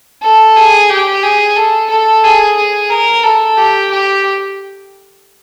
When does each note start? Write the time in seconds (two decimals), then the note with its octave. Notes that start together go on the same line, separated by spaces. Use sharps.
0.23 A4
0.56 G#4
0.90 G4
1.23 G#4
1.56 A4
1.90 A4
2.24 G#4
2.57 G#4
2.90 A#4
3.24 A4
3.57 G4
3.90 G4